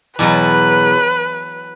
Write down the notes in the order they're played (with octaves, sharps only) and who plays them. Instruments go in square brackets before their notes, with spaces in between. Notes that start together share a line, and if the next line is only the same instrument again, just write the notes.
[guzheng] E2 B2 F#3 [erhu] B4